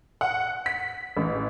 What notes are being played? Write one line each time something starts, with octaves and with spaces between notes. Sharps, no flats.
F#5
B6
A1